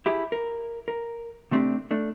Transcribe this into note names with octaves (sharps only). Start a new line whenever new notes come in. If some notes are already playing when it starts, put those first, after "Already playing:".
E4 G4 G#4
A#4
A#4
C3 A3 C4 D4 G4
A3 D4